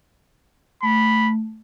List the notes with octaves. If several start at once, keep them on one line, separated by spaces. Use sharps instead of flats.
A3 B5